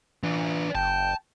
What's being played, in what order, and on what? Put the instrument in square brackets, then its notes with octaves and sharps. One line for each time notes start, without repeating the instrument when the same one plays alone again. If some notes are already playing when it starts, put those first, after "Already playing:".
[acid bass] E3 [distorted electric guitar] D4 F4
[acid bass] F#1 [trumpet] G5 [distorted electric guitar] A5